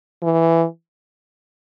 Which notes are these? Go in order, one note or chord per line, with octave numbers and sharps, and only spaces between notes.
E3